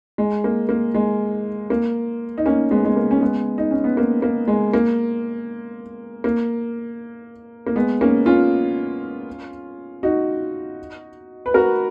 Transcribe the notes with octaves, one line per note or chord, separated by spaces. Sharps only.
G#3
A#3
A#3
G#3
A#3
D#4
A#3 C#4
G#3 B3
G#3
A#3
C#4
G#3 B3
D#4
C#4
B3
A#3
A#3
G#3
A#3
A#3
A#3
G#3 B3
A#3 C#4
C#4 F4
D#4 F#4
B4
F#4 A#4